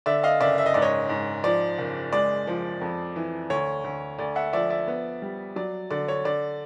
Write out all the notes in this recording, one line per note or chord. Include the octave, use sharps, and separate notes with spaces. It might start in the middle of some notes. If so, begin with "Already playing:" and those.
D3 D5 E5
D#5 F5
F#1 D5 E5
E5
D#5
G#2 D5
C#5 D#5
G#2
F3 D5
F#1
G#3 D5
F3
F2
E3
D2 C#5
D2
D2 D5
E5 F#5
F3 D5 E5
D5 E5
B3
G3
F#3 D5
D3 D5
C#5
D3 D5